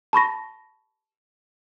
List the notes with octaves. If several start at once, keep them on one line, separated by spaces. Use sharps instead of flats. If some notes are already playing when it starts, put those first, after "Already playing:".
A5 B5 C#6 A#6